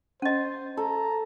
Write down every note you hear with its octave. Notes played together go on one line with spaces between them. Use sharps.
C#4 C5 D#5
A4 A#5